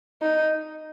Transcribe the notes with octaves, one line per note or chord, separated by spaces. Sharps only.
D#4